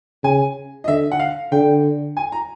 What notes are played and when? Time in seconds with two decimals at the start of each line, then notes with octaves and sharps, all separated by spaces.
0.24 C#3 G#5
0.84 D#5
0.88 D3 E5
1.12 F#5
1.19 F5
1.52 D3 G5
2.17 G#5
2.32 A#5